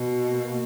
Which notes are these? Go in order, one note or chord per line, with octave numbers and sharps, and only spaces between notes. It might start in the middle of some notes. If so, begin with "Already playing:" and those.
Already playing: B2
A#3